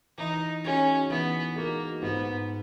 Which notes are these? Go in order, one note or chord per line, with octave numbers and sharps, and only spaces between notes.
E3 D#4
G#3 C#4 D#4 F#4
E3 B3
G#3 A#3 D#4 F#4
G#2 B3